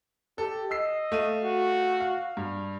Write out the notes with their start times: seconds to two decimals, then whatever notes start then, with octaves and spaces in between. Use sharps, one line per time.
0.38 G4 A4
0.71 D#5 E6 C7
1.12 A3 F5 D#7
1.44 F#4
2.00 F5
2.37 G2